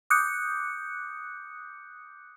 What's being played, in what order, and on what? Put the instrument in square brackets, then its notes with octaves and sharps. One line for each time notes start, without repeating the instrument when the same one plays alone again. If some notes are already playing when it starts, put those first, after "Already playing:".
[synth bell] D6 D#6 F#6 G6 C#7